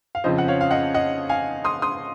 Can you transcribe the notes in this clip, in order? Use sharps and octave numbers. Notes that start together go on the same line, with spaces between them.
F5
F2 C#3 F3 C4 C5 D#5
F#5
C#5 F5
F5
D#5 F#5
D#5 F#5
F5 G#5
C6 D#6
C6 D#6